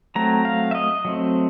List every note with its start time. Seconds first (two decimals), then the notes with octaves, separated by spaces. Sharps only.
0.15 F#3 A3 C4 A#5
0.45 F5
0.71 E5
0.75 D#5
1.05 F#3 A3 C4